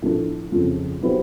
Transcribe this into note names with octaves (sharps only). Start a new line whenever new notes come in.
A2 F3 A3 D4
F2 C#3 F3
F#3 B3 E4 G4 C5